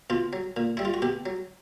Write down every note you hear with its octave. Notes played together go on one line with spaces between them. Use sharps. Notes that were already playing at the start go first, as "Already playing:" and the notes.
B2 F4
F#3
A#2
G3 E4
F4
F#4
B2 G4
F#3